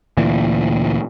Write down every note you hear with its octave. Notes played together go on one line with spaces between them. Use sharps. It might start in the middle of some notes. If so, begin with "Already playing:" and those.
D2 A#2 E3